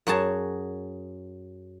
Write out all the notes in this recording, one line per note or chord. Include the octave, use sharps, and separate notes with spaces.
F#2 F#4 G#4 A5